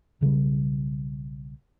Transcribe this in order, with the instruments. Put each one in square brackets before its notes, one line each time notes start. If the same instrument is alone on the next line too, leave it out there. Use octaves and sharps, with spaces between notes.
[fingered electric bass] B1 C#3 E3 G3